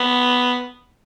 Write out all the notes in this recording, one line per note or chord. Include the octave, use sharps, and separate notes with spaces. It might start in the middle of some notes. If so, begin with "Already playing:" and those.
Already playing: B3